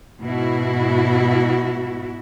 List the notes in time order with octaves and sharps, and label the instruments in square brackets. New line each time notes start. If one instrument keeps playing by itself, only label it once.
[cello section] G#2 B2 E4 F#4